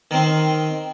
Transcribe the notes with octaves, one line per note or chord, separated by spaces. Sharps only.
D#3 C4